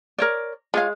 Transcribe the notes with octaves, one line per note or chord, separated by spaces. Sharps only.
A#4 C#5 D5
G#3 F4 C#5 F5